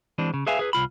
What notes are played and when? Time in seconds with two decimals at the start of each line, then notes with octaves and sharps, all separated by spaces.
0.18 E3 G#3 C4 D4
0.34 C#3
0.47 G#4 B4 E5 F5 G#5
0.59 G#4 B4
0.73 C2 F4 B5